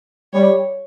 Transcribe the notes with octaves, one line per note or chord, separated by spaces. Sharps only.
G3 C#5